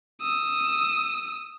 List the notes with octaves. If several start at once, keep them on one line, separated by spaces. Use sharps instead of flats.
D#6 E6